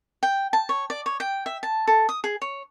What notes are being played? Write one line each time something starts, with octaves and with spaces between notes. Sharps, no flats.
G5
A5
C#5
D5
C#5
G5
E5
A5
A4
D#6
G#4
C#5